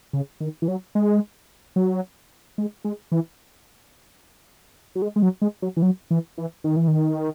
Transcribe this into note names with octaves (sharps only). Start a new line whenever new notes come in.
C#3
D#3
E3
F#3
G#3
F#3
G#3
G#3
E3
F#3
G#3
G#3
F#3
G#3
F#3
E3
F#3
E3
E3
D#3
E3
D#3